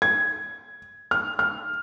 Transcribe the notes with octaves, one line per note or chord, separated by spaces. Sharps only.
G#6
F6
F6